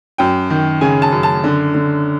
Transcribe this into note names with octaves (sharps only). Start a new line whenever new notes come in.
F#2 G5
D#3
C#3 G#5
A5
F#2
A5
D3
D3